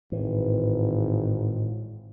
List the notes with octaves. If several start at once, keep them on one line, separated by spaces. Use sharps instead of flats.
G#1 A2 E3